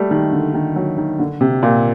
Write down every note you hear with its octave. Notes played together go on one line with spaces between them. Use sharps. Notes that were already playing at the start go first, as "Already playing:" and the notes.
Already playing: G3 A3
D#3
D3
D#3
F#3
D#3
D3
C3
A#2